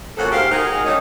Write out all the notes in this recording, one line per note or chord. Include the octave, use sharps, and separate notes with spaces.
F#2 A#2 F3 F#4 A4 F#5
G#2 G4 C5 F5
G#3 D#4 F#4 G#4 A#4
D3 D#3 C#4 D#4